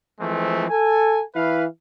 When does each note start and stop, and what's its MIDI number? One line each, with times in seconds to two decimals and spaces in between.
0.20 0.65 52
0.20 0.65 53
0.20 0.65 56
0.20 0.65 57
0.20 0.65 60
0.70 1.23 69
0.70 1.23 80
1.35 1.65 52
1.35 1.65 64
1.35 1.65 71
1.35 1.65 77